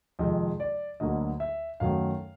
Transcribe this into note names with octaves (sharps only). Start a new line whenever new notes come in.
F2 C3 D#3 G#3 D#5
D5
D2 D3 F#3 A#3 D#5
E5
F#2 D#3 F#3 A3 F5